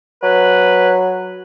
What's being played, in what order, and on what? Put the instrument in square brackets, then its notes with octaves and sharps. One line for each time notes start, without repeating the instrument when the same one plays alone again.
[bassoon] F#3 [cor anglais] B4